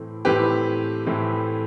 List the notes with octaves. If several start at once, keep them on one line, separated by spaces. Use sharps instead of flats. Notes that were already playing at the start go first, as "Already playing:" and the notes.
Already playing: A2 E3 A3 C4
A2 E3 A3 C4 G4 B4
A2 E3 A3 C4